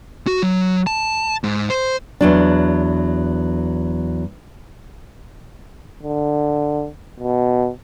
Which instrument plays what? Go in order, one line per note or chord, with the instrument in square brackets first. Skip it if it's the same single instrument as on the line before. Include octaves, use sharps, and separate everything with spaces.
[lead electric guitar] F#4
F#3
A5
G#2
C5
[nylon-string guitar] E2 F#3 D4
[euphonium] D3
B2